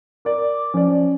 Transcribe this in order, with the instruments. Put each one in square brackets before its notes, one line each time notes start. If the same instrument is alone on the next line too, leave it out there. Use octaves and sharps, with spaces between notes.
[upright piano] A#4 D5 [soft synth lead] D6
[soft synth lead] F3 [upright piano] C#4 D5